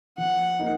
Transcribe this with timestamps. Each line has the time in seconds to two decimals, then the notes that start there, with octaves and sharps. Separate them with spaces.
0.18 F3 F#5
0.59 A#3 D#4